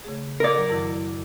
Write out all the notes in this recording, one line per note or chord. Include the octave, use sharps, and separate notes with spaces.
C#3 A3 G#4
A#4 D5
F#3
F#2 D#3 E4